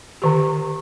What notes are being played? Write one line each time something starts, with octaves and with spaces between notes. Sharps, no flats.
D3 D#3 G4